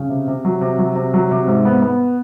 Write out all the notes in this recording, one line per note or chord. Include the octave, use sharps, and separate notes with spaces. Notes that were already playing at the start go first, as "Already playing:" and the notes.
Already playing: C#3
C3
C3
F#3
C3
F#3
C3
F#3
C3
G#2
B3
B3